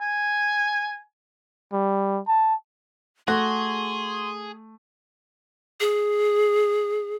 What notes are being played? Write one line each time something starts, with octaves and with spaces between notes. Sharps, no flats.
G#5
G3
A5
A3 F#4 G#4 C6
G#4